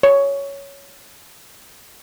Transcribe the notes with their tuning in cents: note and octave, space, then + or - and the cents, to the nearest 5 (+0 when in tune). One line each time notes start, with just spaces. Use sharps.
C#5 +5